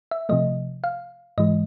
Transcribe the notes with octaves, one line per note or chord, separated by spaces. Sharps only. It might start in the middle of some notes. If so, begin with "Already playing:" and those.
E5
C3 F3 A3 D#5
F5
G#2 E3 G#3 D#5